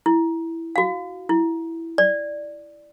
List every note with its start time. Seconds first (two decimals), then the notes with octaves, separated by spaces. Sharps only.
0.06 E4
0.76 F#4 F5
1.29 E4
1.98 D5